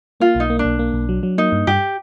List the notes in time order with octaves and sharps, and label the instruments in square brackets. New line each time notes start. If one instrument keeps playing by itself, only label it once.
[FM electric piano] A#3 [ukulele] F4
[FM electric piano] B1 [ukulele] D#4
[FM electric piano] A#3
[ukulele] D4
[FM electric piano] B1
A#3
B1
F#3
F#3
[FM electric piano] A#3 [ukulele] D#4
[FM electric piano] G2
[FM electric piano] G2 [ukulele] G4